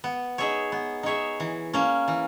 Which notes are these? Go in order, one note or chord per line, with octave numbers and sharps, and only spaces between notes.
B3
D#4 G#4 C#5 E5
B3
D#4 G#4 C#5 E5
E3
A#3 C#4
E3